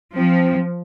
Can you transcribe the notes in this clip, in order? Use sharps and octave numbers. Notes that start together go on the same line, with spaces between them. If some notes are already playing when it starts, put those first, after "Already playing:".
F3 C4